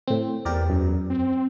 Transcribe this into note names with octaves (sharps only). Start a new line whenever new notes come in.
A2 C4
E2 G4 A#4 D5
F#2
C4